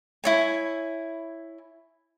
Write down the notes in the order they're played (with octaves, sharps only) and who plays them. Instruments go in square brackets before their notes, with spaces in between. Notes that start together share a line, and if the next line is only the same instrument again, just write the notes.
[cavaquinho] E4 C#5 G#5